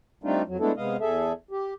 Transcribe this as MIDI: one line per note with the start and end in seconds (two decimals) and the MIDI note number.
0.24 0.42 55
0.24 0.42 57
0.24 0.42 60
0.24 0.42 62
0.24 0.42 63
0.24 0.42 65
0.47 0.57 41
0.47 0.57 54
0.60 0.72 56
0.60 0.72 57
0.60 0.72 59
0.60 0.72 62
0.60 0.72 64
0.60 0.72 69
0.77 0.97 48
0.77 0.97 56
0.77 0.97 59
0.77 0.97 75
0.77 0.97 77
1.01 1.32 40
1.01 1.32 68
1.01 1.32 69
1.01 1.32 76
1.51 1.74 67